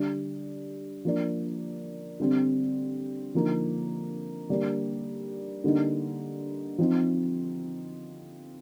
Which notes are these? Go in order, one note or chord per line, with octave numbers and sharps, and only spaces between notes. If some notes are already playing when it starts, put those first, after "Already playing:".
Already playing: D3 G3 D4
F3 A#3 D4
D3 G3 C4
D3 F3 A#3 D#4
D3 G3 A#3 D4
D3 G3 A#3 D#4
F3 C4 D#4